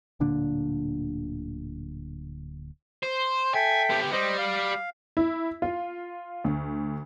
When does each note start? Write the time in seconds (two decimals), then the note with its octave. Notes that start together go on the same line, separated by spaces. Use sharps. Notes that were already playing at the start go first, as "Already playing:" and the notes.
0.20 D1 A#2 D3 D4
3.03 C5
3.54 A4 E5 G5 G#5
3.90 B3 G4
4.12 G3 C5 D#5
4.38 F5
5.17 E4
5.62 F4
6.44 D2